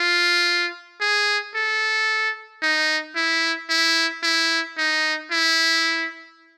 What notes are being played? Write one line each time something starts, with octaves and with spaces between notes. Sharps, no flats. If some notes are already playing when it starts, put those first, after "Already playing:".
Already playing: F4
G#4
A4
D#4
E4
E4
E4
D#4
E4